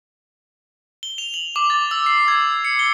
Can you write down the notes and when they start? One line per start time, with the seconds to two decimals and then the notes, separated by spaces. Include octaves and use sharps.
1.03 G7
1.18 F7
1.34 F#7
1.56 D6
1.70 A6
1.91 E6
2.06 C7
2.28 G#6
2.65 C#7
2.79 G7